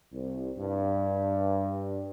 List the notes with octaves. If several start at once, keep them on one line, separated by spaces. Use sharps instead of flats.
C2
G2